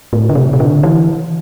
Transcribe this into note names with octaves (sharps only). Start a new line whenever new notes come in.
A2
D3
C3
C3
D3
E3